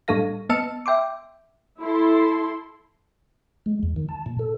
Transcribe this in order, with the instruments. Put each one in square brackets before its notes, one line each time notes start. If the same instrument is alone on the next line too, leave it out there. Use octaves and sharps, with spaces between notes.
[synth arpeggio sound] A2 G3 D4 A4 F5 A#6
B3 D#5 A5 E6 F6 C#7
E5 G5 C6 D6
[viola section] E4 A4 C6
[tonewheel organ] G#3
E2
D#3
A5
A#2
A4